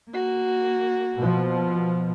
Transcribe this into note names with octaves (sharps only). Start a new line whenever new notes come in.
A#3 F#4
B2 F3